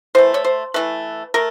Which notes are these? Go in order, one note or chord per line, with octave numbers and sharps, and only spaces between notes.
E3 A3 C5
C#5
C5
E3 A3 B4
A3 A#4